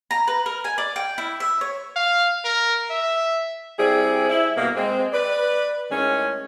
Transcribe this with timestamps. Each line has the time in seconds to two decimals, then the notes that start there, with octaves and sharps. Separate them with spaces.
0.11 A#5
0.27 B4
0.46 A#4
0.64 G#5
0.78 D5
0.96 G5
1.18 E4
1.40 E5
1.61 C#5
1.96 F5
2.45 A#4
2.91 E5
3.78 G3 C4 E4 G#4
4.30 E4
4.57 G2 B2 A#3
4.76 G#3 C4
5.13 B4 D5
5.91 A2 D#3 G#3 C#4